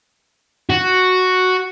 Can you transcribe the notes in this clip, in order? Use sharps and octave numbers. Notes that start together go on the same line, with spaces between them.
F#4